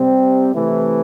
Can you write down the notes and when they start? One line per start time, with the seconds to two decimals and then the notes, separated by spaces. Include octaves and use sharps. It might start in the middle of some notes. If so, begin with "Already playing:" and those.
Already playing: C3 G3 C4
0.54 C3 E3 A3 E4